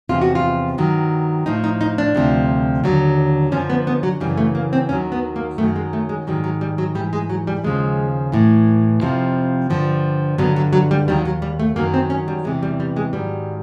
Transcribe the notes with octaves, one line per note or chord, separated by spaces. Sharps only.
E2 C3 F3 F4
F#4
F4
G2 D#3 F#3
A2 F3 D#4
D#4
D#4
D4
D2 C3 F3
D#2 D3 F#3
F#2 D3 F3 C#4
B3
B3
F#3
F#2 C#3 E3 G3
A3
A#3
C4
D#2 D#3 F#3 C#4
B3
A#3
F#2 D#3 F#3 A3
G#3
A3
G#3
G#2 D#3 F#3 G3
F#3
G3
F#3
G#2 E3 G3
G#3
F#3
G3
D#2 C#3 F3 G#3
A2 E3
F2 C3 F3
G2 D3 F3
G2 D3 F#3 B3
F#3
F#3
G3
D#2 D#3 F#3 G3
F#3
G3
A3
F#2 D#3 F#3 A#3
C4
C#4
G3
E2 C3 E3 G#3
G3
G3
G#3
G#2 D#3 F#3 G3